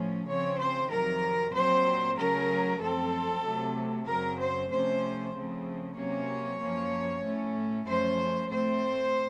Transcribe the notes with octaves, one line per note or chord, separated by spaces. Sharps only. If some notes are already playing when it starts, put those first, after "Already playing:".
Already playing: A2 F3 A3 C#4
C#3 F3 C4 C#5
C5
F2 C3 D#3 F#3 A#4
A#2 F#3 C4 C5
C#3 F#3 A3 C#4 A#4
F#2 F3 C4 A4
C3 F#3 A3
F#2 C#3 F#3 C4 A#4
C5
C3 F3 A3 C#4 C5
C#3 F3 A3 C4
C3 F#3 A#3 C#4 C#5
F#2 F3 A#3 C#4
A2 A3 C#4
F#2 F3 A3 C#4 C5
A2 A3 C4 C5